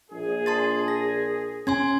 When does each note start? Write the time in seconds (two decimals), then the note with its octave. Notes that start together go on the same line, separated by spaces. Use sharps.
0.11 A#1 G#4
0.46 A5 C6 A6
0.88 A#6
1.67 C#4 G#5 C6 G#6